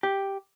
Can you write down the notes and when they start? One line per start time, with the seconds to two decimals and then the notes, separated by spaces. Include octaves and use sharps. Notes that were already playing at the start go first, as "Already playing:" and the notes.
0.03 G4